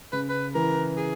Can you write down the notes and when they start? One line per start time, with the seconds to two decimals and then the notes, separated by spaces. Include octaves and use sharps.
0.12 C#3 B4
0.29 B4
0.55 E3 A#4
0.98 G#4